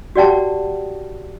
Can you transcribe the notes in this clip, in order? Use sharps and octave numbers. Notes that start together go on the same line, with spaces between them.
F#4 G4 D5 F#5 G5 A5